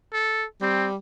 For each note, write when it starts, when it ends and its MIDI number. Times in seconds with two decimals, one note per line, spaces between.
0.13 0.45 69
0.61 0.96 55
0.61 0.88 60